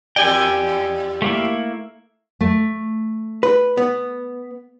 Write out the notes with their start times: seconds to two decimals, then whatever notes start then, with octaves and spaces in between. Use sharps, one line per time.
0.16 E2 G4 D5 G5 G#5
1.22 A3 A#3 E4
2.41 A3
3.43 B4
3.77 B3